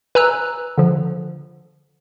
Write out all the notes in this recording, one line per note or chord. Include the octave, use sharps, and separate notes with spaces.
B4 G#5 A#5 E6 F#6
D3 F3